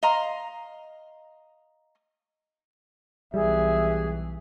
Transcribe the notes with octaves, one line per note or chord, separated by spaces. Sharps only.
D#5 F5 A#5 C6
B1 E3 G3 G#4 E5